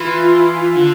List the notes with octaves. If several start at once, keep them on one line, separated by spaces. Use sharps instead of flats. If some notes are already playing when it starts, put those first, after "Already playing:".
Already playing: E3 F4
D3